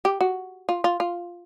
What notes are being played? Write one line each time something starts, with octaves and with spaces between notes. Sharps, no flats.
G4
F#4
F4
F4
F4